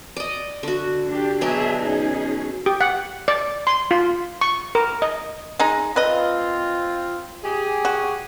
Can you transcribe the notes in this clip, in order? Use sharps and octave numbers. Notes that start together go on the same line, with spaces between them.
D5 D#5
D3 F#4
D4 G4
B2 F#3 D4 G#4 E5
C#4 D#4 G#4
G4
F#5
D5
C6
F4
C#6
A#4
D#5
G#3 D#4
C4 F4 B4 D#5
G4 G#4
F#4